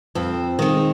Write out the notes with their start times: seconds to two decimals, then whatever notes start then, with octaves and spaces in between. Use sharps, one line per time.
0.15 F2 C4
0.59 D#3 G#3